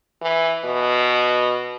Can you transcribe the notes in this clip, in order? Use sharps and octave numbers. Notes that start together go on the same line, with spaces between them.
E3
B2